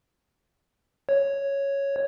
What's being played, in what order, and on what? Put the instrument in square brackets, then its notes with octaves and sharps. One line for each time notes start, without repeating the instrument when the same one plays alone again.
[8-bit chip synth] C#5